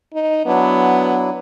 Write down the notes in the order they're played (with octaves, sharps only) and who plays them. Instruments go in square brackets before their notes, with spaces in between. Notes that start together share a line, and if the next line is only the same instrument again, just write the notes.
[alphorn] D#4
[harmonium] F#3 D4 E4 [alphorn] B3